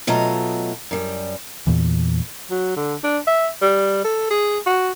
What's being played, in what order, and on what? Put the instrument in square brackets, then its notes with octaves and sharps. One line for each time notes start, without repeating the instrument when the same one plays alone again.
[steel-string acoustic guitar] B2 F#3 A3 F4 D#5 A#5
F#2 G3
[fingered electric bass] E2 A#2 E3
[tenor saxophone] F#3
D3
D4
E5
G3
A4
G#4
F#4